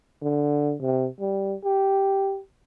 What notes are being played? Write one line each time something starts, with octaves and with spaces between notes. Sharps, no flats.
D3
C3
G3
G4